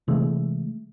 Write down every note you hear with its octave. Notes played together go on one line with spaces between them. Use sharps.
C3 E3 G#3 A3